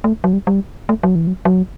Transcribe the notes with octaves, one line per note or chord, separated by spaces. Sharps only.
A3
F#3
G3
G3
A3
F#3
E3
F#3
F#3